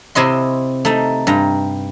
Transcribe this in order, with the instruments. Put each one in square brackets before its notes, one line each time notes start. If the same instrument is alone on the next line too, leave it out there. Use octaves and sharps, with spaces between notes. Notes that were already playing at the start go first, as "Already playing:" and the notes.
[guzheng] C3 E4 D#5 C6
A3 D#4
G2 A#5